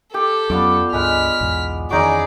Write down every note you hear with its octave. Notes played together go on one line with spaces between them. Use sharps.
G4 A4
F2 F#3 B3 C#4 F4 D5
C#2 G2 G#3 B4 F6 B6
B1 E2 G#2
F2 D#3 E3 C#4 D#4 F#4 G#4 D5